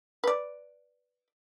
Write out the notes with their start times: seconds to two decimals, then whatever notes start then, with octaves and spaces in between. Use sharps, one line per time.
0.24 B4 D5